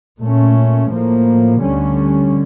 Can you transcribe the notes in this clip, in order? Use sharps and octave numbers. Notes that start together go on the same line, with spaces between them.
A#2 A3 C#4
A2 F3 A#3
D2 D3 G3 C#4